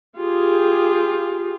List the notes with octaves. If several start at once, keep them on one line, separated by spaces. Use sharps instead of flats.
F4 G4 G#4